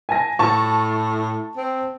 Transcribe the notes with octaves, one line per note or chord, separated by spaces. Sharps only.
G#5 A5 A#6
A2 A5 C#6
C4